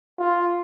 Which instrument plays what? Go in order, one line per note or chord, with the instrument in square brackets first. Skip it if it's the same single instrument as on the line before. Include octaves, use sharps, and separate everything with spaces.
[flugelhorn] F4